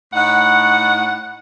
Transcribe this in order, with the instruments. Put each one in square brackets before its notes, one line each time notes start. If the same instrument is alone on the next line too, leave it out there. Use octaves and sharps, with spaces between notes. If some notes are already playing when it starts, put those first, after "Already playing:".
[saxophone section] A2 D#4 F#5